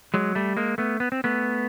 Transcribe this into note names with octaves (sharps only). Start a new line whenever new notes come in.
F#3 G#3
G3 A3
G#3 A#3
A3 B3
B3
C4
A3 B3